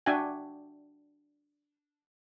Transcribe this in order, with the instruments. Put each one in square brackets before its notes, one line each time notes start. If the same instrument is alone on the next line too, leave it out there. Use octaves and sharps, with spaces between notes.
[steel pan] D4 F#4 E5 G5 G#5